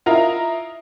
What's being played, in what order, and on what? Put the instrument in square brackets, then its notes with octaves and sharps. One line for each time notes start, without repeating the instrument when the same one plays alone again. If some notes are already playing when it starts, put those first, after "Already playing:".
[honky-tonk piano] E4 F4 A#4 D#5 A#5